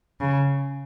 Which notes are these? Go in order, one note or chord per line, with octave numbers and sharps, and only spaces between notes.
C#3